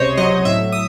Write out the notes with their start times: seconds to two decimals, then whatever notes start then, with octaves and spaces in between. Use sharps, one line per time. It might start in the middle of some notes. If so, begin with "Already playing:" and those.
Already playing: C#2 C3 C5 C#5 D#5
0.17 F#3 D#5
0.45 A2 E5
0.72 D#6